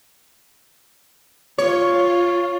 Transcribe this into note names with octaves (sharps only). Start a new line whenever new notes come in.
F4 C#5